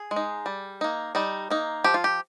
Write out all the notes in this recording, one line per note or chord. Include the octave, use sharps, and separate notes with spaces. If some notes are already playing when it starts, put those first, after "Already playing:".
Already playing: G#4
G#3
D#4
G3
A#3 D#4
G3 D#4
A#3 D#4
F3 G4
F4
G4